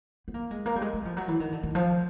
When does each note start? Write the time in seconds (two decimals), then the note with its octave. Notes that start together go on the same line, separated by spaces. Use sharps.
0.28 B3
0.34 A#3
0.51 G#3
0.66 A#3
0.76 G3
0.81 G#3
0.93 G#3
1.05 F3
1.17 F#3
1.28 E3
1.40 D#3
1.52 D3
1.63 D#3
1.75 F3